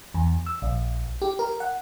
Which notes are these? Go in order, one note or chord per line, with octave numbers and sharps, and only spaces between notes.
E2
E6
A#1
G4
A#4
F#5